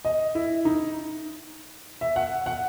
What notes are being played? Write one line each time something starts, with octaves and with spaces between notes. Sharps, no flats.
D#5
E4
D#4
E5
F#5
F#5